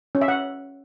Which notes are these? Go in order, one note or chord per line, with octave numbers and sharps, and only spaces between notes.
C#4
E5
F#5